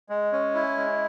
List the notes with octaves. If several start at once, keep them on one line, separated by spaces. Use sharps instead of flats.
G#3
C#4
E4
G#3